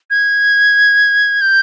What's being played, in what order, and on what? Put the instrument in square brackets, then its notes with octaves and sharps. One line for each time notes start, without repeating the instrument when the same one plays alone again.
[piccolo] G#6
G6